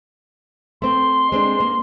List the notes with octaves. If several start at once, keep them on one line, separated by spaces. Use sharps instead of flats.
A3 C4 C6
G#3 C4 D4
A#3